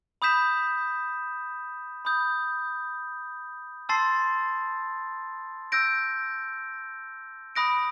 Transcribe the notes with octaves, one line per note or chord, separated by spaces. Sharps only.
B5 D#6 G6 B6 E7
B5 D#6 G6
A5 C6 E6 A6 C7
E6 G6 A#6 D7
B5 D#6 F#6 A#6 D7